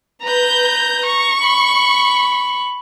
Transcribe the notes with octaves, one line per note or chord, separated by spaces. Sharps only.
B4 A#5 G6
C#6
B5